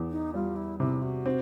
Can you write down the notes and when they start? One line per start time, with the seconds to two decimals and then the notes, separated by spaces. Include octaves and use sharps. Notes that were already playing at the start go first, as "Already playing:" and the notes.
Already playing: E2
0.11 D#4
0.34 G3 F4
0.56 E4
0.80 C3 E4
1.02 F#4
1.26 C4